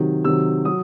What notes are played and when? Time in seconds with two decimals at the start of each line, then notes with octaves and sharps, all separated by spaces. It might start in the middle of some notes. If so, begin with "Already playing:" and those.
Already playing: C3 D#3 F#3
0.24 C3 D#3 F#3 E6
0.65 F#3 D#6